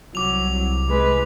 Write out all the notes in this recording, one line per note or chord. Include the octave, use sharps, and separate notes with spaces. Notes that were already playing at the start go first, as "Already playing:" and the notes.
C2 F#3 D6 F7
G#3 B4